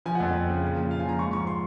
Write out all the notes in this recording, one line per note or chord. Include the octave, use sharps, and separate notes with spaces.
F3 G#5
F#5
F2
F2
C#3
A#2
F3
A#2 F5
G#5
F3 A#5
G#2 C#6
F3 C#6
C6